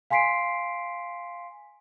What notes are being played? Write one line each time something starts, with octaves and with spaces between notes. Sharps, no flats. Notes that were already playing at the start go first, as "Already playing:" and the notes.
F5 G#5 C6 B6 C7 D7